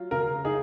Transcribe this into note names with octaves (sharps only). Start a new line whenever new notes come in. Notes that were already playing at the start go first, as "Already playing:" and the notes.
Already playing: F#3 F4
C#3 A#4
D#4 G#4